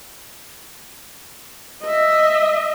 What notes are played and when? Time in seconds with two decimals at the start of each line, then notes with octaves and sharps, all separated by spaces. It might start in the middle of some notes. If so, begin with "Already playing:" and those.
1.82 D#5 E5